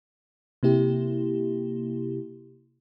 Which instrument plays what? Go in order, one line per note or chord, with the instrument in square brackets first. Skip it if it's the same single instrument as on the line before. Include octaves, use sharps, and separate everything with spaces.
[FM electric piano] C3 A#3 E4 G4